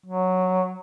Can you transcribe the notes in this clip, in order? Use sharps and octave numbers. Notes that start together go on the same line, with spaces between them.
F#3